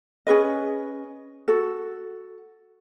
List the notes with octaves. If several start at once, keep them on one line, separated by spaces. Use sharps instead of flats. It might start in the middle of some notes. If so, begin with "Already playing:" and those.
C#4 G#4 B4 D#5
F#4 A4